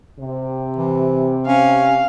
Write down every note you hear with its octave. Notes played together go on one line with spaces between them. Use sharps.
C3
E3
C#4 F5